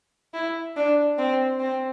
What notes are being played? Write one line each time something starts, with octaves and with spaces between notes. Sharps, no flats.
E4
D4
C4
C4